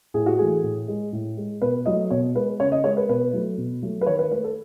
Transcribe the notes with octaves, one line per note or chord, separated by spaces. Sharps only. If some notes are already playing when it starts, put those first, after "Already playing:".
A2 G#4
F#4
E3 A3 G#4
A2
G#3
A2
G#3
B2 B4
F#3 A3 D#5
B2 C#5
G#3 B4
C#3 C#5
D#5
G#3 C#5
B4
B2 B4
F#3 A3
B2
F#3 A3
B4
D#3 C#5
B4
A3 B4
A4